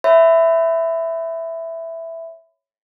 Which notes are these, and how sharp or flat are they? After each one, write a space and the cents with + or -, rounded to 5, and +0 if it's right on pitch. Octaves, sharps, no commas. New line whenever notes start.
C#5 +0 E5 +0 B5 +25